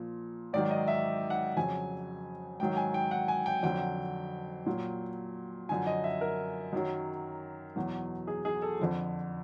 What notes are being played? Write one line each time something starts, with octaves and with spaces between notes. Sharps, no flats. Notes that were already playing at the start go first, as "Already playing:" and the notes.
Already playing: A#2 F3
G#2 D#3 F#3 D5
D#5
E5
F#5
F2 C#3 F#3 G#5
G#2 D#3 F#3 G5
G#5
G5
F#5
G#5
G5
F2 D3 F#3 G5
A#2 F#3
F#2 D3 F3 G#5
D#5
E5
A#4
F#2 D#3 F#3
E2 B2 F#3
G#4
G#4
A4
F2 D3 F3